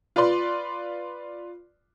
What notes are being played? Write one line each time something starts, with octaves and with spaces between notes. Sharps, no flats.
F4 B4 D5 C6